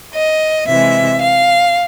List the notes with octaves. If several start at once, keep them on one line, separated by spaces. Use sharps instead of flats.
D#5
C3 E3 G#3 E5
F5